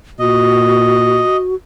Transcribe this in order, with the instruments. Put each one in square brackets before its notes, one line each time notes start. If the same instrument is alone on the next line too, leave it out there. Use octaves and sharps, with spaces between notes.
[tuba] A#2 [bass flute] F#4 [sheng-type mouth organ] D#5